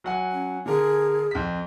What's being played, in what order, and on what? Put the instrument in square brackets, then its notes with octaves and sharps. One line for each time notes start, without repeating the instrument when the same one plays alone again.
[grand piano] F#3 F#5 G#5
[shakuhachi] C#4
[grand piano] D3 A#4 [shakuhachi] G#4
[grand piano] F2 B6